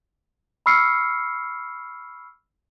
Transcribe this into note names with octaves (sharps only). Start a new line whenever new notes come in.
B5 C#6 E6 F6 C7 C#7